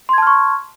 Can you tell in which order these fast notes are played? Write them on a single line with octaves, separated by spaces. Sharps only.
C6 G#6 A5 F6 C#6